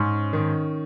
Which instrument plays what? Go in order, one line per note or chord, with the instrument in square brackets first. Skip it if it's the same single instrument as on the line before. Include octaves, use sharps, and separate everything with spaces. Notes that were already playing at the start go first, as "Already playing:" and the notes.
Already playing: [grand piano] G#2 [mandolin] C#4
[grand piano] D#3